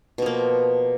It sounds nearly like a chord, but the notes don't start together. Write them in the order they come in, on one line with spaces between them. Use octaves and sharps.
B2 F3 A#3